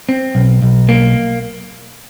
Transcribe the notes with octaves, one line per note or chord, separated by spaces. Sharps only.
C4
B1
B1
A#3